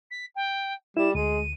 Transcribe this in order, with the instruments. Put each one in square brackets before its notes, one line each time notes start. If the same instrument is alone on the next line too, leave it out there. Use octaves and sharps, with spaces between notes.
[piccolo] B6
G5
[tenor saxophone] G3 [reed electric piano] E4 [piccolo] E7
[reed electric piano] D2 [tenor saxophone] G#3 [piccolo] D#7